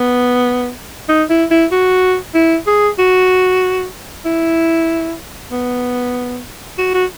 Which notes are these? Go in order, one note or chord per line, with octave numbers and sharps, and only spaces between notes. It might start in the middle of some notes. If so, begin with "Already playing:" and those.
Already playing: B3
D#4
E4
E4
F#4
E4
G#4
F#4
E4
B3
F#4
F#4